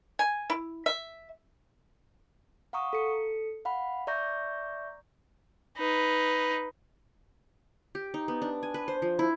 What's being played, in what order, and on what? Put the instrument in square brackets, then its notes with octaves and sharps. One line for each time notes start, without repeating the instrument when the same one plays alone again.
[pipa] G#5
E4
E5
[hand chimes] F5 F#5 A#5 C#6 D#6
A4 C#7
F5 F#5 B5
D5 E5 A#5 C#6 G6 A#6
[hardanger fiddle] D#4 B4
[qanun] G4
D#4
B3
D4
G#5
B4
C5
F3
E4